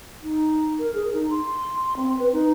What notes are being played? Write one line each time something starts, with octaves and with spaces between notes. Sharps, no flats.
D#4
A#4
G#4
D#4
C6
C4
B4
D#4